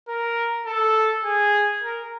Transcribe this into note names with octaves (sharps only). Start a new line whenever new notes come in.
A#4
A4
G#4
A#4